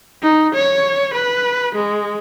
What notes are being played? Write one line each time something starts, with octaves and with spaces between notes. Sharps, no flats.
D#4
C#5
B4
G#3